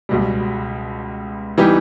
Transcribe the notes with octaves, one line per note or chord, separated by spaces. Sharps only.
C#2 B2 G3
E3 G3 B3 D#4 G4